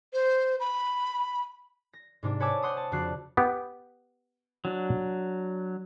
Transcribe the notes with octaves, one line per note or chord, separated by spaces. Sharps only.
C5
B5
A#6
G#2 C3 D4
B4 C#5 G#5 A5 D6 E6
C5 F#5 C6 D#6
A5
F2 C#3 D4 F#4 F#6 C7
B3 G4
F#3 D4